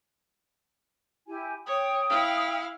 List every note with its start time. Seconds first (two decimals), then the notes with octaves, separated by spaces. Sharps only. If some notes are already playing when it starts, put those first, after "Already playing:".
1.27 E4 G4 G#5
1.67 C#5 G5 D#6
2.10 E4 F5